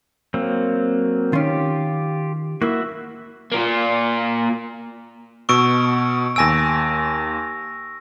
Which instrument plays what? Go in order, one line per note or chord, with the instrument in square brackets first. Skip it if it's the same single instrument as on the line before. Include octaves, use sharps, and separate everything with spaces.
[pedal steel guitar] F#3 A#3 C4
[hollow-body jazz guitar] D#3 C#4 [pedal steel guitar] F4 G4
[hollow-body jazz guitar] A#3 E4 [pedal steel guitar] F#4 E5
[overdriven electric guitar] A#3 F4
[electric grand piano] B2 E6 [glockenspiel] C#6 D7
[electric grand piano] D#2 G#5 D7 [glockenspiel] E6 A#6